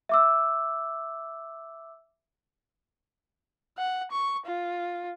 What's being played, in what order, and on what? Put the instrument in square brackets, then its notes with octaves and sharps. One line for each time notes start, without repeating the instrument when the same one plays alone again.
[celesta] E5 D6 E6
[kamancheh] F#5
C#6
F4